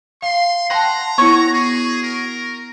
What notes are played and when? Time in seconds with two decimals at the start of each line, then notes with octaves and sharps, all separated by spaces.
0.22 F5 C6
0.70 F#5 G5 A5 A#5 C6
1.18 B3 E4 F#4 C#5 C#6
1.53 G#4
2.03 A#4